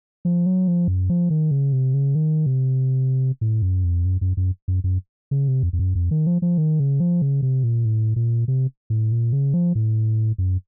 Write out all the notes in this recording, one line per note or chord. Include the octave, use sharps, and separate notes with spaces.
F3
F#3
F3
F#2
F3
D#3
C#3
C3
C#3
D#3
C3
A2
F#2
F2
F#2
F#2
F#2
F#2
F#2
C#3
C3
F2
F2
F#2
F2
D#3
F3
F3
D#3
C#3
F3
C#3
C3
A#2
A2
A#2
C3
A2
A#2
C#3
F3
A2
F#2